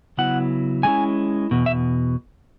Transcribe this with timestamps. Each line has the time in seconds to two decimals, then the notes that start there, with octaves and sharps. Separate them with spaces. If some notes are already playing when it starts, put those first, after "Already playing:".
0.17 C#3 F#3 B3 E4 F#5
0.83 A#2 G#3 C#4 E4 G#5
1.51 E2 B2
1.66 E5